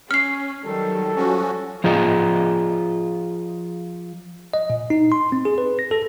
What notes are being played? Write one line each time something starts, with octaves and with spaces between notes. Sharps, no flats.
C#4 F6 C7
D#3 F#3 G3 A4
F3 C#4 F#4
F3 F4 G#4 D#5
D#5
A#2
D#4
C6
C4
G#4
B4
A#6
A4